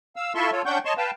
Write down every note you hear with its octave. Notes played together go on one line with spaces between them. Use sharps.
F5 E6
E4 F4 A4 E5 C6 C#6
F4 A4 C#5
C#4 D4 F#5 G5 C#6 G6
C#5 D#5 A5 C6 C#6
B4 F5 G5 A5